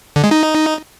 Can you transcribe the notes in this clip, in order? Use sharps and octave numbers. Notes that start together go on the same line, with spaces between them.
D3
G#3
D#4